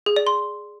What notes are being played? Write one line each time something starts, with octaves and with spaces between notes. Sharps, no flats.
G#4
D5
C6